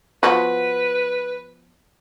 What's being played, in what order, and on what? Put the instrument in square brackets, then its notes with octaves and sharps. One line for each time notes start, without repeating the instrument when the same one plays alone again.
[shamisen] F3 B3 F#4 [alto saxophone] B4